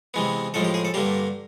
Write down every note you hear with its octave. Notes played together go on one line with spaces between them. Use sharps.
C3 E3 G#3 B3
A2 F3 G#3 A4
G4
G#4
A4
G2 D3 G3 A#3 G4